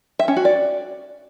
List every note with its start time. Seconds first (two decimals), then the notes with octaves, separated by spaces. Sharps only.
0.19 E5
0.28 C#4
0.36 F#4
0.45 D5